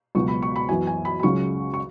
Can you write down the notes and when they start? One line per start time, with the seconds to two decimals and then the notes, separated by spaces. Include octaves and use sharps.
0.15 C#2 B2 F#3 B3 C#6
0.28 B5
0.42 C#6
0.56 B5
0.69 F#2 E3 B3 G#5
0.87 G#5
1.05 B5
1.20 B5
1.23 C#2 C#3 F#3 C#4 C#6
1.74 C#6